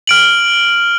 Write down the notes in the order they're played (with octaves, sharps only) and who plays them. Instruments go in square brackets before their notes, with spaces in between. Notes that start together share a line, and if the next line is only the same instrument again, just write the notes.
[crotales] F6 D7 F#7